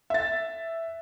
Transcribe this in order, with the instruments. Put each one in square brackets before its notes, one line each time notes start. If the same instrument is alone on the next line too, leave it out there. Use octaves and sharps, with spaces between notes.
[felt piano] E5 A6